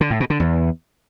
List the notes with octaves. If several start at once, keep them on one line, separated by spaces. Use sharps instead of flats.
D3
A2
B2
D3
E2